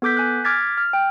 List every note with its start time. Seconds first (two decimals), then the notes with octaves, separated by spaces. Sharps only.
0.02 B3 A4 D6 G6 B6
0.17 G#5 F#6
0.44 D6 F6 G#6 A6 B6
0.78 F6
0.93 G5